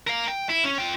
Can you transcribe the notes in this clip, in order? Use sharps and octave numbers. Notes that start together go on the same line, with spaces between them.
A#4 F5
G5
E4
C#4
F4 G5